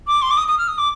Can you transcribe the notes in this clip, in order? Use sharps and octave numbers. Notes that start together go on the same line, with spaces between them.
D6
C6
D6
D#6
D#6
F6
D#6
D6